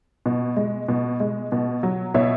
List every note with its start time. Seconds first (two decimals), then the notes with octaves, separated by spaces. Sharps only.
0.26 B2
0.56 G#3
0.88 B2
1.20 G#3
1.52 B2
1.83 F#3
2.14 B2 C#5 E5